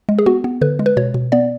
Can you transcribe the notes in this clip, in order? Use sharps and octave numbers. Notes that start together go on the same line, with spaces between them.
G#3
G#4
B3 F#4
B3
D3 B4
G#3
B4
B2 C#5
B2
B3 D5